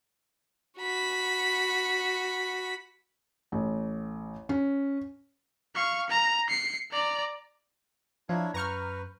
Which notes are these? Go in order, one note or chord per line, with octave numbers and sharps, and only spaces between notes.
F#4 B5
A1
C#4
F5 C#6
A#5
C7 C#7
D5 A#5
F3 D4 E4 C#5 F5 A#5
F#2 B4 A#5 C#6 F6 G6